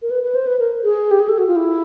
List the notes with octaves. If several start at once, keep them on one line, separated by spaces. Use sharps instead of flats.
A#4
B4
B4
C5
B4
A#4
G#4
G4
G#4
A4
F#4
F4
E4